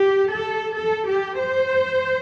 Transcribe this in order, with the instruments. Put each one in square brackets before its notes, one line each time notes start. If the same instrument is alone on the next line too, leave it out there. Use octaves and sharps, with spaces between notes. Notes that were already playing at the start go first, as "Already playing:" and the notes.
Already playing: [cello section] G4
A4
A4
G4
C5